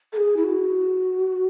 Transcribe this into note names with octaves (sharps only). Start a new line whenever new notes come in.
A4
G#4
E4
F#4